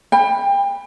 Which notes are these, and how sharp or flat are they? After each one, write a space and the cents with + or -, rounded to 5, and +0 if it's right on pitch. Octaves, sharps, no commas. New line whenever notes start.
G5 +30 B5 +0